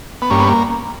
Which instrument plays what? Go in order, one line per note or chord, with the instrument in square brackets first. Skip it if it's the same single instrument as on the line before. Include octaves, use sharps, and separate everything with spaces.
[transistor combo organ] B3
G2 A#3 C#4
B3
A#3